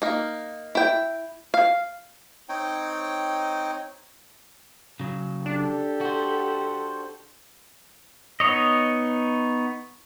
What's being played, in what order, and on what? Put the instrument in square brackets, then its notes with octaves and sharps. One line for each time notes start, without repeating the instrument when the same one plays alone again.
[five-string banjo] A#3 D#4
E4 G5
F5
[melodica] C4 D#4 C#5 G5
[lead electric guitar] C#3 F#3
[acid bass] D4 [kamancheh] G4 A4
[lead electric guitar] F#4 C5
[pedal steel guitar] B3 D#4 C#5 D#5